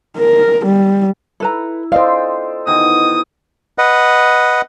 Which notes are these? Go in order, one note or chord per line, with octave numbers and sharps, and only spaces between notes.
A#4
G3
E4 A4 B4 A#5
F4 A4 C5 D5 D#5 F5 G5
B2 D#3 E3 D#6
B4 D#5 F#5